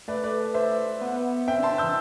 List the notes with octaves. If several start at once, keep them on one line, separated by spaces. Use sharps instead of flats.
A3 B4 D5
B4 D5
C5 E5
B3
C4 E5 G5
D4
A5 C6
D4
E3 E6 G6